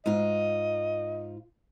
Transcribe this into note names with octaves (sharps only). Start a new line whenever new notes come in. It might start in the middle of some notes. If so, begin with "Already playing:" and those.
G#2 F4 D#5